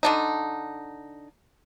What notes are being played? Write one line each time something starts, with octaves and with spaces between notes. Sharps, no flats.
D3 D4 D#4